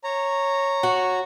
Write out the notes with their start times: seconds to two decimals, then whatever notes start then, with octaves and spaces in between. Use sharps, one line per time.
0.04 C#5 A#5
0.83 F#4